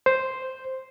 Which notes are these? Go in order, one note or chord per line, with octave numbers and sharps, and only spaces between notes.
C5